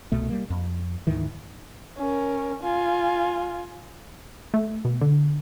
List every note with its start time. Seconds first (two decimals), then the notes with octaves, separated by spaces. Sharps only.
0.12 C2 B2 A3
0.29 G3 A#3
0.50 F2
1.07 D2 G#2 D#3 E3
1.98 C#4 A#4
2.63 F4 G#5
4.54 A3
4.85 B2
5.01 D3